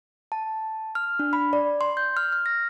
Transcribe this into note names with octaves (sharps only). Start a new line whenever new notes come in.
A5
F6
D4
B5
D5
C6
G6
F6
F6
A#6